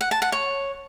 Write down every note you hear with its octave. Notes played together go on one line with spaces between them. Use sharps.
F#5
A5
F#5
C#5